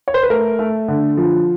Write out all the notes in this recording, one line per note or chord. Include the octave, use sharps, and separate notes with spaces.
C#5
C5
B4
A3 A#4
A3
D3
F3